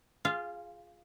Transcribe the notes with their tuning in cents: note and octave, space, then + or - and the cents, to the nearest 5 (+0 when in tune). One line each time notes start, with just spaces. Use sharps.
F4 +0 G#4 +0 F5 -25